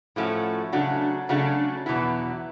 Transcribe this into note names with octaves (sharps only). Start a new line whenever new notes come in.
A2 F3 A3 C#4 F#4
C#3 F#3 A3 D4 F#4
C#3 F#3 A3 D4 F#4
E2 B2 F#3 B3 E4